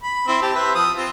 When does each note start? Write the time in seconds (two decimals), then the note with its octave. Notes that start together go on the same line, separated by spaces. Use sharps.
0.03 B5
0.28 C4 E4
0.42 G4 A5
0.56 B4 C5 E5
0.75 F3 D#6
0.96 C4 F4